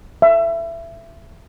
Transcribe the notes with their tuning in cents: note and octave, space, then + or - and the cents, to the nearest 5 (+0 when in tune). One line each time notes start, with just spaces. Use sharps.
E5 +20